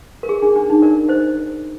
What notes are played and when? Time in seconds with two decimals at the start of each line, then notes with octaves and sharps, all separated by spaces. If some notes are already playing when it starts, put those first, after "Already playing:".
0.23 A#4
0.29 G#4
0.42 D4
0.56 D4
0.70 D#4
0.82 A#4 D5
1.09 C5 D#5